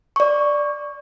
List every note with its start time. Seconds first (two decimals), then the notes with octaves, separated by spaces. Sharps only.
0.16 D5 C#6